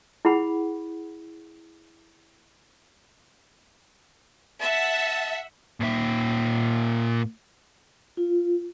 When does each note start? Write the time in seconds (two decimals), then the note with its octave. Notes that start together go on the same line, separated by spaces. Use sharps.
0.25 E4 G#4 F#5 B5
4.61 E5 F#5 A5
5.80 A#2 E5
8.17 F4